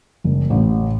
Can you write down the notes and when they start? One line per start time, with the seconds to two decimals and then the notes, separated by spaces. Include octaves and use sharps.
0.24 F#1
0.50 A1